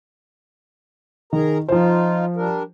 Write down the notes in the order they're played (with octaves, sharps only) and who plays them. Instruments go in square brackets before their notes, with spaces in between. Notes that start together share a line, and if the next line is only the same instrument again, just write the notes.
[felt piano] D#3 [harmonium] G#4 A#4 A#5
[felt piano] F3 C5 [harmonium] D#4 F4
[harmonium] G3 D4 A#4